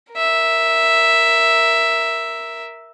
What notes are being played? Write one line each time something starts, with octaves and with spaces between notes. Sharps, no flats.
A#4 E5